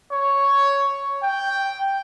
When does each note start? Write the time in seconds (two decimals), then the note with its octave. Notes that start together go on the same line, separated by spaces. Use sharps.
0.12 C#5
1.23 G5